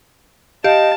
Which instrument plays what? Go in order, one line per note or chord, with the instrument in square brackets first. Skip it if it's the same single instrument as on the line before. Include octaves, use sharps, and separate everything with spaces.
[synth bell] G4 [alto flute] D#5 [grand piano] F5 [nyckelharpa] A5